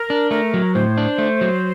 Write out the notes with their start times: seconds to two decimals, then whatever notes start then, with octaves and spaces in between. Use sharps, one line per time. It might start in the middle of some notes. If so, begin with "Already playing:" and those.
Already playing: A#4
0.10 D4
0.31 A3 A#4
0.54 F#3
0.75 A2 C5
0.98 D4
1.18 A3
1.41 F#3